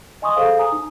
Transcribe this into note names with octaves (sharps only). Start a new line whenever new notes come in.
D#5 G#5 C6 C#6 D#6
G#4 A4 C5 F5
G#5 A#5 D#6
D#4